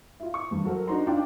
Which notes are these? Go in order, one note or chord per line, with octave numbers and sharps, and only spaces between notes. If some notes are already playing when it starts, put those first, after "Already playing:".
E4 F4
C#6
E2 G2
F#3 F#4 A4 A#4 C5
D4 D#4 F#4 C5 A#5 C6
D4 D#4 F4 G5 D6